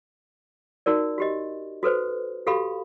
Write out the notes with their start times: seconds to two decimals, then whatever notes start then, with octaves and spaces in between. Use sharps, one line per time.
0.86 D#4 F#4 A#4 D5
1.18 F#4 G4 D#5
1.83 F#4 A4 B4 C5
2.47 F#4 G4 A4 F5 B5